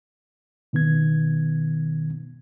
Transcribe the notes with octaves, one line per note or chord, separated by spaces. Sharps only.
B2 D#3 B3 G#6